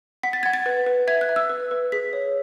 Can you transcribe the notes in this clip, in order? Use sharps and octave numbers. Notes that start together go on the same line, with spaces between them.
F#5 B6
A6
F#5 G#6
A6
B4
B4
E5 G#6
F#6
E5
E6
B4
B4
G#4 B6
C#5